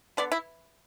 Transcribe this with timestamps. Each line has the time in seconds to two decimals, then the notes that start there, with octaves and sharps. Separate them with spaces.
0.17 D3 B3 D5
0.32 E4